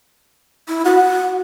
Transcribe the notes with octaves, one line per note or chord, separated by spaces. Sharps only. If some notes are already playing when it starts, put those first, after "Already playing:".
E4
F#4 F#5